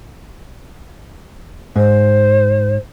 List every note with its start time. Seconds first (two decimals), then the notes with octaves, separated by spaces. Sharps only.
1.76 G#2 C5